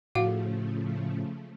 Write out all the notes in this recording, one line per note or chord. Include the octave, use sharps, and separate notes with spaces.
A2 C#3 F3 A3 F#4 F5 F#5